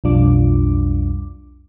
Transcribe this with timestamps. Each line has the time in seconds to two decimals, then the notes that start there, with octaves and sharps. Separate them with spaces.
0.04 B1 F2 G3 D4 F4 D6